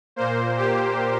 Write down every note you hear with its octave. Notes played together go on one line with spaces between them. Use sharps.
A#2 A#3 C5
G4